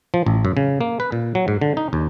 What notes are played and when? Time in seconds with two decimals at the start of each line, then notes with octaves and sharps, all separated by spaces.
0.14 F3
0.26 A1
0.45 F#2
0.57 C#3
0.81 A#3
1.00 B4
1.12 A#2
1.35 F#3
1.48 G#2
1.61 D3
1.77 D#4
1.93 D#2